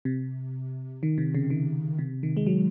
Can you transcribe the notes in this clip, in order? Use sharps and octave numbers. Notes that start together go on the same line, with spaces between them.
C3
D#3
C3
C#3
D#3
C3
D#3
G#3
F#3